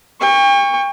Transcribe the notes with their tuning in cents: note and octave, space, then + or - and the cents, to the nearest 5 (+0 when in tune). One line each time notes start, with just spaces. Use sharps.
G5 +40 C#6 +0